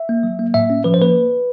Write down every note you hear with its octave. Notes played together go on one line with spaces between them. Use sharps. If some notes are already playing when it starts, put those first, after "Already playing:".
Already playing: E5
A#3
F#3
A#3
A2 E5
C#4
F3 B4
C5
A#3 B4